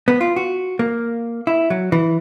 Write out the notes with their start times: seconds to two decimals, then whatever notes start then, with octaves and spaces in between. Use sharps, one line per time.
0.08 B3
0.21 F4
0.36 F#4
0.79 A#3
1.47 E4
1.70 F#3
1.92 E3